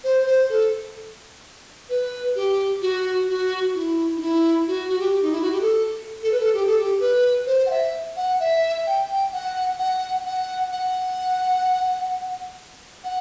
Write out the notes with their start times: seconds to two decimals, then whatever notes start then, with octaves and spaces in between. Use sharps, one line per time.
0.04 C5
0.26 C5
0.49 A4
1.89 B4
2.36 G4
2.82 F#4
3.28 F#4
3.75 E4
4.17 D#4
4.22 E4
4.67 F#4
4.89 F#4
4.99 G4
5.22 D#4
5.32 E4
5.42 F#4
5.52 G4
5.61 A4
6.23 A4
6.32 B4
6.40 A4
6.54 G4
6.66 A4
6.79 G4
7.00 B4
7.47 C5
7.66 F#5
7.70 E5
8.16 F#5
8.40 E5
8.87 G5
9.12 G5
9.33 F#5
9.79 F#5
10.26 F#5
10.72 F#5
13.04 F#5